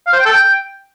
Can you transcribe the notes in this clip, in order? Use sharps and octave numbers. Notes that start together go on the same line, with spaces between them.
F5
C5
G5
A4
G5